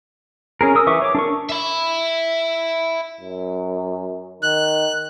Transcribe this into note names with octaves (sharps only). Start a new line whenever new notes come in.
C#4 G#4 A#4
A#4 D#6 E6
E3 B4 E5 C#6 D6
C#5 D6
D4 A#4 C#6
E5 B5
F#2
D#3 F#6